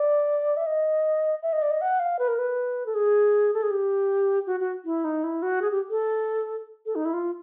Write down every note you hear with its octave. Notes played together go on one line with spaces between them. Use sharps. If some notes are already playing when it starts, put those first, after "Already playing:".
Already playing: D5
E5
D#5
E5
D#5
D5
D#5
F#5
F5
B4
A#4
B4
A4
G#4
A4
G#4
G4
F#4
F#4
E4
D#4
E4
F#4
G#4
G4
A4
A4
D#4
E4
F4